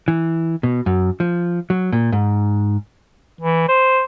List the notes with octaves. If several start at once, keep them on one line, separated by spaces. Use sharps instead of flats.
E3
B2
F#2
F3
F#3
A#2
G#2
E3
C5